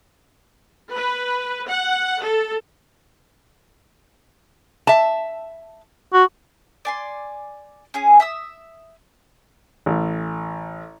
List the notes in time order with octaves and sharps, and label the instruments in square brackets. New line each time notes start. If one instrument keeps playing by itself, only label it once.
[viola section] B4
F#5
A4
[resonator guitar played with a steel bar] E5 A5
[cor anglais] F#4
[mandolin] D5 G#5 C6
C#4 G#4 G#5
E5 D#6 E6
[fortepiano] A1